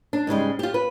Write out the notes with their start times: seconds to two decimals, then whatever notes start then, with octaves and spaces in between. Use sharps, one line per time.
0.13 D4
0.27 G#2 C#3 G3 G#3
0.59 F4 G4
0.74 B4